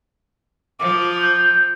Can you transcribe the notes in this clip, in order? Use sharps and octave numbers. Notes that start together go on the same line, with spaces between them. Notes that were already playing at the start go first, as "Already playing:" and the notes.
F3 D6
G6